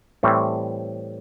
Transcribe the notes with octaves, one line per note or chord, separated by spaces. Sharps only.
A2 E3 G3 C4